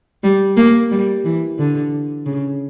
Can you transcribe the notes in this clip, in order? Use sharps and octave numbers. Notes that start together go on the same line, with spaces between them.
G3
A#3
G3
E3
D3
C#3